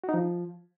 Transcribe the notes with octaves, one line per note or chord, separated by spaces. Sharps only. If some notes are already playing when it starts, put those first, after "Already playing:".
F#4
D#4
F3